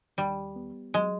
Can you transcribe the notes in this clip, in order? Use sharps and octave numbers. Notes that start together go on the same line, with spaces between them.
D#2 G3
B3
F#3 G#3